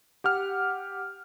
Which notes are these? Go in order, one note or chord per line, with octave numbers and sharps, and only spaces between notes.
G4 F#5 F6